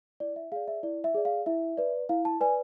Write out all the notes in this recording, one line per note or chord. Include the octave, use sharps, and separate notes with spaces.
E4 D5
E5
G#4 D5 F5
E5
E4 D5
E5
G#4 D5
F5
E4 E5
B4 D5
E4 F5
A5
B4 D5 G#5